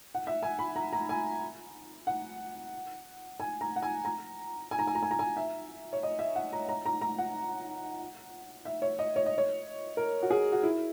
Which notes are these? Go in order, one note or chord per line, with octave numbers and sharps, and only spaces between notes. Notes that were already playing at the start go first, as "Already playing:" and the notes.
F#5
E5
G#5
B5
A#5
A#5
G#5
F#5
G#5
A#5
F#5
G#5
A#5
G#5
A#5
G#5
A#5
G#5
A#5
G#5
E5
C#5
D#5
E5
F#5
A#5
A#5
A#5
A#5
F#5
E5
C#5
D#5
C#5
D#5
C#5
A#4
F#4
G#4
F#4
E4